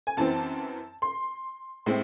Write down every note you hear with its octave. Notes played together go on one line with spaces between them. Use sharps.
G#5
F#2 E3 C4 A5
C6
A2 G#3 C4